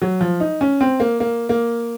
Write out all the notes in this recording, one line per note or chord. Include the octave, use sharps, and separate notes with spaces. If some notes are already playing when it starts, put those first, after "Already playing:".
F#3
F3
D#4
C#4
C4
A#3
A#3
A#3